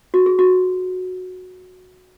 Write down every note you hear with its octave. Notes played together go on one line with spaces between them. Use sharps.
F#4
G#4
F#4